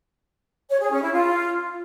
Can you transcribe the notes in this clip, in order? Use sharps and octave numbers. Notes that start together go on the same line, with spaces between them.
C#5
G#4
C#4
E4
F4